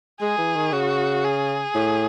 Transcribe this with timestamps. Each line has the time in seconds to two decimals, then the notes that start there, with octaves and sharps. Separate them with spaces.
0.21 G#3 G#4
0.38 E3
0.55 D#3
0.72 C#3 F#4
1.24 G#4
1.75 A2